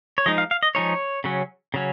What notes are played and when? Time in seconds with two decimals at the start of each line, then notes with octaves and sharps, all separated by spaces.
0.18 C#5
0.26 F3 G#3 D#4 D#5
0.38 F5
0.51 F5
0.63 D#5
0.75 F3 G#3 D#4 C#5
1.24 C#3 F#3 C#4
1.74 C#3 F#3 C#4